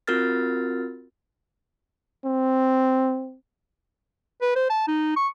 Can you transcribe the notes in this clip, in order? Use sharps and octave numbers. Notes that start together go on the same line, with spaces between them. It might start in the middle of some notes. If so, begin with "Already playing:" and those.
C4 F4 F#4 A#4 F6 A6
C4
B4
C5
A5
D#4
C#6